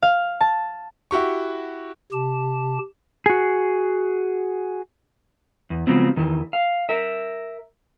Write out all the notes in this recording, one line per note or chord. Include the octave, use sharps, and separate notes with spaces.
F5
A5
E4 F#4 G4 C#6
C3 G4 A5
F#4 G#4
E2
C#3 F3 F#3 G#3 B3 C4
E2 D#3 E3
F5
A#4 E5